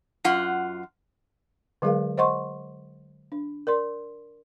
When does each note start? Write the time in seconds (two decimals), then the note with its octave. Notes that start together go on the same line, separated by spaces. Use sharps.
0.24 F#2 F4 F#5
1.82 D3 F#3 G#3 G#4 A#4 F5
2.18 C5 D#5 F#5 C6 C#6
3.32 D4
3.67 A#4 D5 C6